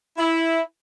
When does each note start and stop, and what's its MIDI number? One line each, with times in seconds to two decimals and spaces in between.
0.17 0.61 64